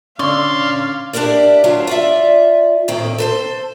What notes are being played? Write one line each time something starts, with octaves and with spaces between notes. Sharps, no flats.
A#2 D3 C#4 C#5 D5 F5 C6
D4 E4 G4 A#4 D5
D2 F#3 D4 F4 F5 A#5
F4 D5 E5
A2 D#3 A#3 C4
A4 B4 C5